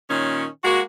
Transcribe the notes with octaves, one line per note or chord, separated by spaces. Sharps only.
A#2 D#3 C#4
G#3 A#3 F#4